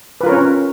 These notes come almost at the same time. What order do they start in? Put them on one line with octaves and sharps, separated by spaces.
B4 F4 A#4 C#5 C#4